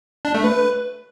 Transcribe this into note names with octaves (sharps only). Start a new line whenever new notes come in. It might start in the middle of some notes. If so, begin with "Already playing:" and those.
D4
A3
B4